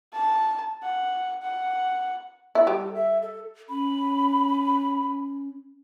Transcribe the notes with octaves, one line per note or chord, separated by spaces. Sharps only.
A5
F#5
F#5
E4 A4
G3
E5
A4
C#4 B5